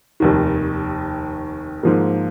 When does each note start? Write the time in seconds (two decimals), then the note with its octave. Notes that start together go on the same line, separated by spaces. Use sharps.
0.20 F1 D#2 D#3
1.83 G#2 F3 A#3